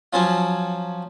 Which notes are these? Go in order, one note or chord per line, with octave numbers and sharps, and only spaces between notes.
F3 F#3 C#4 F4